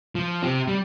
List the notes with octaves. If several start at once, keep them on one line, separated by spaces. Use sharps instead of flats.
F3
C4 G4
G3